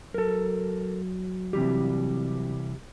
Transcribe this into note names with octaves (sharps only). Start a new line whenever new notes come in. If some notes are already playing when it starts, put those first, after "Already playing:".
F#3 A4 A#4
C3 E3 G3 G4